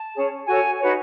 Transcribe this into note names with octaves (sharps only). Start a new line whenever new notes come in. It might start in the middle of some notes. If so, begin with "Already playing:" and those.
Already playing: A5
C#4 G#4 C#5
F#4 A4 C#5 G#5
D#4 F#4 B4 C#5